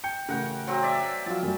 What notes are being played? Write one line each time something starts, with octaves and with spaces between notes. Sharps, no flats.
G5 G6 C#7
A1 C#3 A#4 F#5 G5
F#3 C4
D5 E5 G#5
F3 F#3 F4 A5
F#2 G3